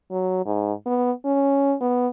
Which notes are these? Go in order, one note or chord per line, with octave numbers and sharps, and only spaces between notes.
F#3
G#2
B3
C#4
B3